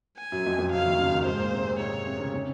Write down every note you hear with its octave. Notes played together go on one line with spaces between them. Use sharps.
G#5
F#2 F#3
F2 F3
F2 F3
F#2 F#3 F5
C#3
D#2 D#3
C#2 C#3
D#2 D#3
G#2 G#3 C5
A#2 A#3
C3 C4
A#2 A#3
G#2 G#3 C#5
C3 C4
C#3 C#4
C#3 C#4